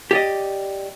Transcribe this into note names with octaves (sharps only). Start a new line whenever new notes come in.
G4 D5 D#5